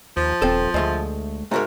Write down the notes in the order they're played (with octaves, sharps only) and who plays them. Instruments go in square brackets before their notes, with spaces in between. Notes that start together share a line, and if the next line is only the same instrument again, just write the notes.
[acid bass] D#2 [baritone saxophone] F3
[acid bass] D#1 [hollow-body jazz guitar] C4 A4
[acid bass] D2 [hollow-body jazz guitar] G#3 A3 C6
[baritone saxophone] G#2 [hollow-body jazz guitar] A3 F#4 A#4